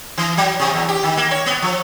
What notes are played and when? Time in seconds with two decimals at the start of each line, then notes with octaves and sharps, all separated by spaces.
0.18 E3
0.37 F#3
0.60 C3
0.73 E2
0.89 G4
1.03 D#3
1.17 A#3
1.31 C#5
1.46 B3
1.62 F3